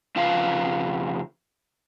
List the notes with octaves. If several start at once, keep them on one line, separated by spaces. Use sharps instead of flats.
F2 C#3 F4 B4 F5 A5